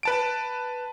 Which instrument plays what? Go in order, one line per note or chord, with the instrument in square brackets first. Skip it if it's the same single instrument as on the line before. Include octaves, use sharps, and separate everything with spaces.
[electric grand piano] B4 A5 D7